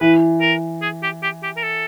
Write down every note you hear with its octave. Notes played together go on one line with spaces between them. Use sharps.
E3 B4
A#4
G#4
G4
G4
G4
A#4
A4